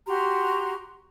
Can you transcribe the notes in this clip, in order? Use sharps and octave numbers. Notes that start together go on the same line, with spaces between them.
F#4 G4 A#5 C6